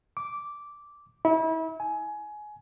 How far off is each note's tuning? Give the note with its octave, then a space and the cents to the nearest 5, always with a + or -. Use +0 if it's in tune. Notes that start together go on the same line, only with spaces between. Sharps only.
D6 -10
E4 -35
G#5 +20